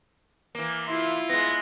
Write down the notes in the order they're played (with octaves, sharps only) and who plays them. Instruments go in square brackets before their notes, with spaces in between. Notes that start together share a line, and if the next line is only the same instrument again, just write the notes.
[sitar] E3 A#3
[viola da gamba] E4 F4 [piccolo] C6
[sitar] G#3 B3 [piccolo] A#6